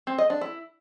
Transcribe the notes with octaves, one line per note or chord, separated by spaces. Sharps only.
C4
D#5
D4
E4